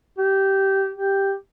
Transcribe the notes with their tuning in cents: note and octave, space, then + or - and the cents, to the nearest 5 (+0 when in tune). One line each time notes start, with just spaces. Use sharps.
G4 -15
G4 +0